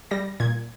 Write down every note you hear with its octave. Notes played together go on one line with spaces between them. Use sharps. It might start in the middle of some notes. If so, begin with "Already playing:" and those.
G3 A#6
A#2 G#6